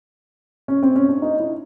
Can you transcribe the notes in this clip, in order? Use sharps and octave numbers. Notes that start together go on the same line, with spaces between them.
C#4
C4
C#4
D4
D#4
E4